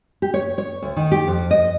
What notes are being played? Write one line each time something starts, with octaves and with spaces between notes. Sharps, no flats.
G4
C#5
C#5
D2
D#3
G4
F2
D#5